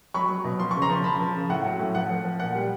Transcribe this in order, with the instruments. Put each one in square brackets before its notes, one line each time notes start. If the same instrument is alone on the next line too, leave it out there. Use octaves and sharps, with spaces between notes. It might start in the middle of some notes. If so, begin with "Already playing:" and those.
[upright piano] F#3 B5 C#6
F#3
B2
F3 C6
C#3 C#6
A#5 C6
F3
F3 A5 B5
F3
C#3
A2 F#5
F#3
A2
F3 F#5
F3
F3
A#2 F#5
G3